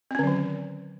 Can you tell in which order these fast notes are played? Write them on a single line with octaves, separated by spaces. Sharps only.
C4 C#4 D3 F#3 D#3